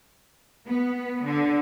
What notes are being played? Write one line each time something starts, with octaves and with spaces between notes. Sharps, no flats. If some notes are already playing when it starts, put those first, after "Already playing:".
B3
D3